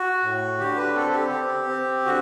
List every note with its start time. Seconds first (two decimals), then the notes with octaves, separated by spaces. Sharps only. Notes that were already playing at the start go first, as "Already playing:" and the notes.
Already playing: F#4
0.23 A2
0.59 D3 G4
0.77 B4
0.95 C4 A4
1.14 G4
1.32 C4
1.69 C4
2.05 D3 F#4